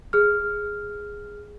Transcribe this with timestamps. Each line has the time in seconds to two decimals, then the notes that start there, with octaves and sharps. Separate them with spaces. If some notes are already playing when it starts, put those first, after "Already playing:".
0.13 G#4 F6